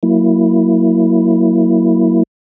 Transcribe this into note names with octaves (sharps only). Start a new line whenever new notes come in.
F#3 A#3 E4